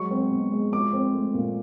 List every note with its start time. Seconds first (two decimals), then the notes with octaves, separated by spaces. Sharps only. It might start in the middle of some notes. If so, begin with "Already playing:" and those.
Already playing: F#3 G#3 C#6
0.11 C4
0.31 B2
0.52 G#3
0.72 F3 D6
0.93 C4
1.14 A3
1.34 A#2